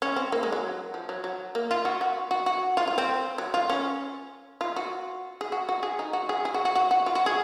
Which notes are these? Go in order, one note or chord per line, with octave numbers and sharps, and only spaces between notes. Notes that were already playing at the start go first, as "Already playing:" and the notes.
C#4
C4
A#3
G#3
F#3
F3
F#3
F#3
A#3
F4
F#4
F#4
F#4
F#4
F4
F4
C4
F#3
F4
C#4
F4
F#4
G#4
F#4
F#4
G#4
D#4
F#4
G#4
G#4
F#4
F#4
F#4
F#4
F4
F#4
G#4